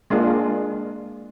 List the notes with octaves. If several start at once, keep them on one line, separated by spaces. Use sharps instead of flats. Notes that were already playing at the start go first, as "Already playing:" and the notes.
G#3 A#3 D4 F4